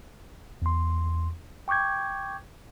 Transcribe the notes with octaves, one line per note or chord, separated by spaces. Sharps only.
E2 C6
G5 C#6 D6 G6 G#6